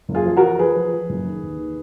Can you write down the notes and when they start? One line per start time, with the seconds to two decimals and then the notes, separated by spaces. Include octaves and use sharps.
0.09 F#1
0.15 F4 G#4
0.26 F3
0.37 F#4 A#4
0.42 F3
0.59 F3 G#4 B4
0.75 F3
0.93 F3
1.10 F#1
1.26 D#3
1.43 D#2
1.59 D#3